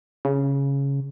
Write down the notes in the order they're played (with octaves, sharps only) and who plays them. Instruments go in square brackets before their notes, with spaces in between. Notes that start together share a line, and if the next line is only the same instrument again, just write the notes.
[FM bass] C#3